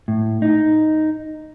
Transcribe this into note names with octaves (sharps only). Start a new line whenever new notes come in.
A2
D#4